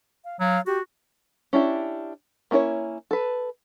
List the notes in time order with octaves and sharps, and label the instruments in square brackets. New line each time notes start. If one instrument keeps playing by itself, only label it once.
[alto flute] F5
[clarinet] F#3 [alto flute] F5
[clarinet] F#4 [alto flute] G4
[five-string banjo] C#4 D4 E4 G4
A#3 C#4 E4 A#4 C#5
A4 B4